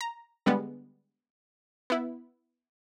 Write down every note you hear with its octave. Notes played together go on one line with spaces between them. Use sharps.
A#5
D3 G3 G#3 B3
B3 E4